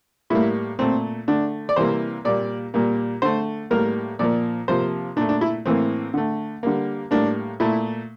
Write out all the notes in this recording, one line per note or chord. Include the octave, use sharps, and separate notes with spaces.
A2 G3 A#3 E4
A#2 A3 C4
D3 A3 D4
D5
C3 E3 G3 A#3 C5
A#2 G3 A#3 D5
A#2 G3 A#3
D3 A3 C5
A2 G3 A#3 A#4
A#2 F3 A#3 D5
C3 F3 A#3 C5
A#2 A3 D4
D4
E4
A2 E3 A#3 C4
D3 A3
D3 G3 A#3
A2 G3 A#3 D4
A#2 A3 E4